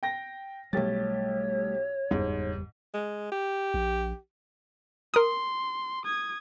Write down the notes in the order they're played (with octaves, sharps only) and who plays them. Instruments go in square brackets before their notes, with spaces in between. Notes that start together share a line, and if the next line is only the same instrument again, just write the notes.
[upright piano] G5 A#6
[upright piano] B1 G4 A6 [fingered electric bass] G3 A3 [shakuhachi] C#5
[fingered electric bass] F#1 E2 G3 [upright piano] G#2
[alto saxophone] G#3
G4
[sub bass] A#1
[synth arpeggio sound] A#4 D#6 [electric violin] C6
[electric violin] D#6 G#6